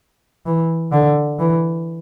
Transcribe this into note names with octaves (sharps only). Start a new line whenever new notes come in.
E3
D3
E3